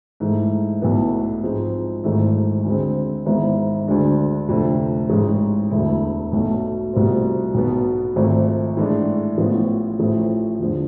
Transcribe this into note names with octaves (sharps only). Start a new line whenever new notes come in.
G#2 E3 A3
B1 A2 E3 B3
G#2 F3 G#3 C4
G#1 G#2 E3 A3
D2 D3 G#3 C4
G#1 G#2 E3 B3 E4
D2 D3 G#3 D4
F1 F2 D3 A3
A1 G#2 G#3
E1 D2 D3 A3 E4
B1 B2 A3
C2 B2 A3 C4 F4
B1 B2 B3
G#1 G#2 F3 A3 C4
A2 E3 G#3 D4
A1 A2 F3 B3 F4
A1 A2 F3 A3
E2 D3 F3